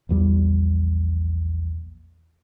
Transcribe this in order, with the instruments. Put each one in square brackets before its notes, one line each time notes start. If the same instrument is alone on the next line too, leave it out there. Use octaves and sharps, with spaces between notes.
[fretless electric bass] A#1 E2 G3